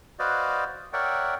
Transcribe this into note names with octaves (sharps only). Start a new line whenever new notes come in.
F#4 B4 C5 D5 D#5 F5
A#4 C#5 D5 E5 F#5 G5